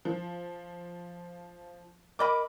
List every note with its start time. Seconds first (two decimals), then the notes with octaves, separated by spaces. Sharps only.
0.05 F3
2.19 A#4 D#5 B5 D6